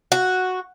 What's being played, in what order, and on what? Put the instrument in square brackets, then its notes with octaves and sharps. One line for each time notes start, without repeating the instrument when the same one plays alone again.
[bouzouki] F#4